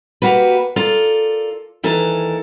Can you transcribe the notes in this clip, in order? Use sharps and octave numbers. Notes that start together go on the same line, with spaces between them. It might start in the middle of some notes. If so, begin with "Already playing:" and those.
A#3 F#4 G4 B4
F4 A4 A#4 D5
D#2 E3 A4 A#4